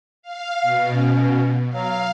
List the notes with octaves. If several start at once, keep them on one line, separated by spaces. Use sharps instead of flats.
F5
B2 F5
C#4
F#3 F5